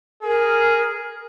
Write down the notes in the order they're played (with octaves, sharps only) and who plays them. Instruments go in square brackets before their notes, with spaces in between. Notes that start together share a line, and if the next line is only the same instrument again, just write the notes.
[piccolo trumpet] G#4 [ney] A#4